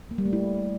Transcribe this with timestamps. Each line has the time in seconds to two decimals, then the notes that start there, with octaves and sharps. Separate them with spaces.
0.11 A#3
0.18 G3
0.25 A3
0.33 E4